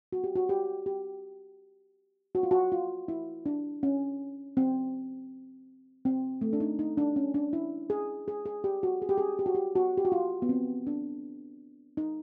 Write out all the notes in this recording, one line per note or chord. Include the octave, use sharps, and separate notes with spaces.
F#4
G4
F#4
G4
G4
F#4
F4
F#4
F4
E4
D4
C#4
C4
C4
A3
D4
D#4
D#4
D4
C#4
D4
E4
G#4
G#4
G#4
G4
F#4
G#4
G4
G#4
G4
F#4
G4
F#4
G4
F#4
F4
B3
C4
D4
D#4